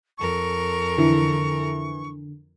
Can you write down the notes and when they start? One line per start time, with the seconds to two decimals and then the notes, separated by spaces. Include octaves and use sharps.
0.18 F2 A4 A#4 C#6
0.98 D3 E3